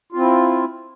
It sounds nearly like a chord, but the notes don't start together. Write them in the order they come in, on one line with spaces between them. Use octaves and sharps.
F4 C4 E4